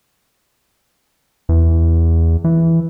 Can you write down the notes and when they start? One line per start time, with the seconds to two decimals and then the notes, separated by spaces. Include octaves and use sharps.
1.49 E2
2.44 E3